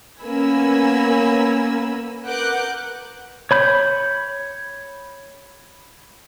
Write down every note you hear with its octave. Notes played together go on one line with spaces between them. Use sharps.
A#3 B3 C#4 G#5 B5 E6
A#4 B4 F#5 D6 F#6 G6
C#5 B5 G6